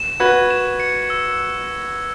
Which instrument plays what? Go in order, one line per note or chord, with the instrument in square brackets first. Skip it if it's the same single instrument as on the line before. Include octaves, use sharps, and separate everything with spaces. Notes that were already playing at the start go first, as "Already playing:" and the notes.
Already playing: [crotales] E7
[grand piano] F#4 B4 [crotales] G#6
[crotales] E7
C#7
E6